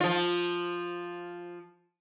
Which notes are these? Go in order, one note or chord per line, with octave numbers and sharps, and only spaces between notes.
F3 F4